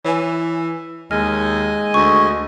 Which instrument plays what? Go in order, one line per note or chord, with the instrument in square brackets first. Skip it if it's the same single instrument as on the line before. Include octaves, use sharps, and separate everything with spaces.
[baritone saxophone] E3 [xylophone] C#5 G#5
[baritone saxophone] D#2 [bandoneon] G#3 D#5 G#5 [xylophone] F6
[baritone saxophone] D2 [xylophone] C#6